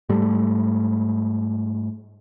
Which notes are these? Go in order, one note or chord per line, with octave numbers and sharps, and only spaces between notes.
G#2 G3 A3